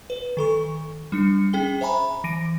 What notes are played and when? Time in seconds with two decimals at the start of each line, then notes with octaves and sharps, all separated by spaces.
0.10 B4
0.37 D#3 A4 C#6
1.12 G3 D4 C#7
1.53 C#4 G#4 G5 G7
1.81 C5 E5 G#5 A#5 B5
2.24 E3 A#6 D7 D#7